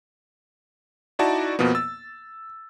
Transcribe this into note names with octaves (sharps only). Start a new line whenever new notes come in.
D#4 E4 F#4 D5 A5
F2 B2 F3 A#3 B3
E6 A6